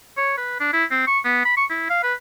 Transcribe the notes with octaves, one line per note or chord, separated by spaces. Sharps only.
C#5
B4
D4
E4
C4
C#6
B3
B5
C#6
E4
F5
B4